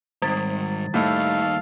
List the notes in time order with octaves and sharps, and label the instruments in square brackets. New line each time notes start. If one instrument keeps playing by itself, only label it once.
[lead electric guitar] G#2 D#3 [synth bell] G3 A6
[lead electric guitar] D#2 D#4 [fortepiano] A2 [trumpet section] A4 F5